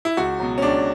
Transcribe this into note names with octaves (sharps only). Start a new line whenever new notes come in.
E4
C#2 F#4
B2 F#3
C#4
C#2 D4